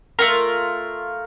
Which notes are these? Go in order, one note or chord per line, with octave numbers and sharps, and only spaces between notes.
A3 F4 A#4